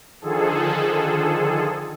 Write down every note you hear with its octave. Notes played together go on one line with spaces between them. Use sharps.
D3 D#3 F3 G#4 A4